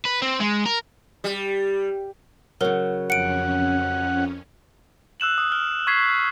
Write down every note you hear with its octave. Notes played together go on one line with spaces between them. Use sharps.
B4
C4
G#3
A#4
G3
C#3 F#3 A#4
F2 C#4 F#5 C#7 D7
E6 F#6 E7 F#7
D#6
F6
C#6 G#6 B6 C7